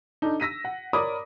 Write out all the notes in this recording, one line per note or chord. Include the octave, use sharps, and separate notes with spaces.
D4 D#4 A4
E6 A#6 B6 D#7
F#5
A#4 C#5 D5 B5 D6 D#6